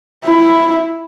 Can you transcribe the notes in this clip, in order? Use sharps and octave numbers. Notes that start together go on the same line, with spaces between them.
E4